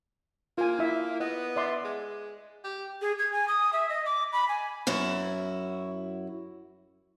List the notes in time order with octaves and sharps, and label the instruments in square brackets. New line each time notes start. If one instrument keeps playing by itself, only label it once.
[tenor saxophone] A#3 [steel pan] F4 G#5
[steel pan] E4 E5
[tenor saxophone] B3 [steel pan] D#5
[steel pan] D5 E5 C6
[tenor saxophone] G#3
G4
[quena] G#4
G#6
G#5
D#6
E5
D#5
D6
B5
G#5
[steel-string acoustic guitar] F#2 E4 F#4